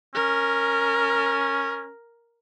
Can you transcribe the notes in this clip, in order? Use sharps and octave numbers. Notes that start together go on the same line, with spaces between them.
C#4 A#4